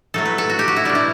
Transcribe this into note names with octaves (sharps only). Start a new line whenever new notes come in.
A2 F#3 A3 A4
B4
A4
F#4
G4
F#4
E4
B2 G3 D4
E4